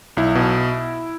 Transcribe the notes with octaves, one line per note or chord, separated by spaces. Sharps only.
B1 E4
B2